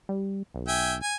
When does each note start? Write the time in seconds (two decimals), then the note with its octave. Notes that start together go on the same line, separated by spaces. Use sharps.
0.09 G3
0.54 B1
0.68 E5 G5 G#5
1.02 G#5